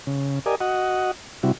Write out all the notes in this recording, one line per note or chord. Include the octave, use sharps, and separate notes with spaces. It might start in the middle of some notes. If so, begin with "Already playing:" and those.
C#3
G4 A#4 D5 D#5 G#5
F#4 D#5 F#5
C3 G3 E4 F#4